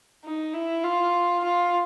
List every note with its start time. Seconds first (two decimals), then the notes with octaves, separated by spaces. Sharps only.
0.25 D#4
0.54 E4
0.84 F4
1.44 F4